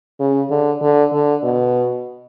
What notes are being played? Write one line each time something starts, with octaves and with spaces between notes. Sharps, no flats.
C#3
D3
D3
D3
B2